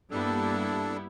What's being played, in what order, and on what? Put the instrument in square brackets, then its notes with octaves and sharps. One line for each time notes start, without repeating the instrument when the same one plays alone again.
[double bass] G2 A#3 [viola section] G3 B3 E4 [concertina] D4 A4